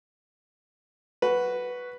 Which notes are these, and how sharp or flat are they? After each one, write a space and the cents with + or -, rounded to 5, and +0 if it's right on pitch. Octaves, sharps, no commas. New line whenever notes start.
F#4 +0 B4 +0